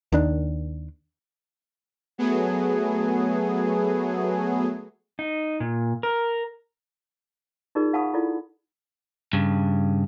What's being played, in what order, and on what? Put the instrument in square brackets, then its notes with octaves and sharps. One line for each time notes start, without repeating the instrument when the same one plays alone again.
[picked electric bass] D#2 D#3 D4
[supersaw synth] F#3 A3 B3 G#4
[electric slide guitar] D#4
A#2
A#4
[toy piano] D#4 F4 G#4 A#4 D5
F5 F#5 A5 B5 C#6 D#6
E4 F4 A4 D5
[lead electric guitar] G2 C#3